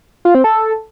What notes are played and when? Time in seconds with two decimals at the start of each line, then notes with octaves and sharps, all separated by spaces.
0.25 F4
0.35 C4
0.44 A4